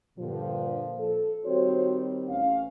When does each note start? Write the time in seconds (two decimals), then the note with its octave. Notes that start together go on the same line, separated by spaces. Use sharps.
0.19 G2 A#2 D3 F3
0.97 A4
1.45 D#3 G3 C4 F#4 C5 C#5
2.29 A1 C#4 F5